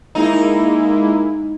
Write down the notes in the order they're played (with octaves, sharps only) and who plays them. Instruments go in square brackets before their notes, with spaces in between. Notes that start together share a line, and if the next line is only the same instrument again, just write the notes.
[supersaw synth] G#3 A#3 E4 [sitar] D#4